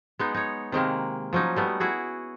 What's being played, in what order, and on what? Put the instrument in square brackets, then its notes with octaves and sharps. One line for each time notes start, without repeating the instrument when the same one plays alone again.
[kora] G#3 B3 D#4
D#4 C#5
C3 D#3 G#3 A#3
F3 F#3 C#4 D#4
G3 A3 B3
E4 F#4 G#4